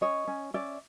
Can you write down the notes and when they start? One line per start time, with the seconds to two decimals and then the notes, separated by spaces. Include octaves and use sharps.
0.01 C#4 C#5 D#5
0.27 C#4
0.54 C#4 D5 E5